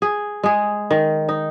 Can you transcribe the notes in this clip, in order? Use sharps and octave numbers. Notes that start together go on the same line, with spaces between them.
G#4
G#3 G#4
D#3
D#4